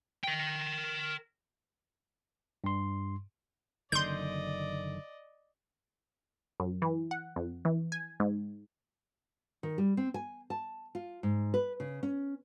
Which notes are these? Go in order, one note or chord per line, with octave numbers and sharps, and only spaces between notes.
A#4 G5
G2 C6
F#1 D3 D#3 D5 D#5 C6 G6
F#2
E3
F#5
F2
E3
G#5
G#2
D#3
G3
C4
G#5
A5
F4
G#2
B4
C#3
C#4